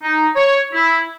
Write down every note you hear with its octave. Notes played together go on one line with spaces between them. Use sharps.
D#4
C#5
E4